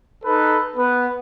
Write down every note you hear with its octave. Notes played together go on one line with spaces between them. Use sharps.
D#4 A4 B4
B3 B4